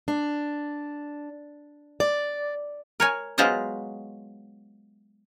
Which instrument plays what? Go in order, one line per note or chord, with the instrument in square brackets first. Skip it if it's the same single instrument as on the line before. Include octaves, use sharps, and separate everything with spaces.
[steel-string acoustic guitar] D4
D5
[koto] A#4 C#5 G#5
F#3 G#3 B3 F4 C5 D#5